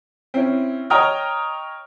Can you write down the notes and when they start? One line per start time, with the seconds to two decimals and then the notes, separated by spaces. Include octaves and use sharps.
0.34 C4 C#4 E4
0.90 C#5 D#5 G5 A#5 D#6 F6